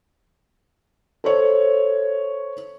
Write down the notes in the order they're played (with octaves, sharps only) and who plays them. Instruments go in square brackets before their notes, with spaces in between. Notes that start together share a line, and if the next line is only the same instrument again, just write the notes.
[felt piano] A4 C5 C#5